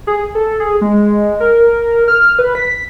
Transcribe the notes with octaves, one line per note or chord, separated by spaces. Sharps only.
G#4
A4
G#4
G#3
A#4
F6
B4
B6